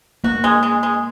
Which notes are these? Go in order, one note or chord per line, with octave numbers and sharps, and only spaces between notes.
A#3 F#4
G#3
G#3
G#3